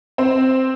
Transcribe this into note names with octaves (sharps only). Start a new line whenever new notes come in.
C4